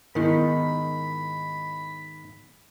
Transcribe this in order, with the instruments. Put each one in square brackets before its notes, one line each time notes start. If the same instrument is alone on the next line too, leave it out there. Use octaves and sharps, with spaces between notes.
[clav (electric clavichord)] G#2 D#3 D#4 [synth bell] B3 E4 A#4 [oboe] B5